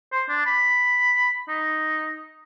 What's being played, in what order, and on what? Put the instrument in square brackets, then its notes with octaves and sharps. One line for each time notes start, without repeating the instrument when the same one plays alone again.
[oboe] C5
D4
B5
D#4